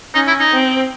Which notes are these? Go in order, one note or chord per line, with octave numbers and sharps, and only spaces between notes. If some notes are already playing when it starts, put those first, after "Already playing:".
C#4 D#4
E4
D#4
C4